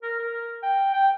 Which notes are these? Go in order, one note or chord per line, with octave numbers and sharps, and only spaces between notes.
A#4
A#4
G5
G5